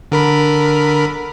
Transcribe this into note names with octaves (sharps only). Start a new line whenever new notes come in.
D3 A#4 B5